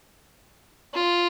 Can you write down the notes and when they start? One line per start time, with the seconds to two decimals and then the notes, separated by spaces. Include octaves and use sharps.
0.94 F4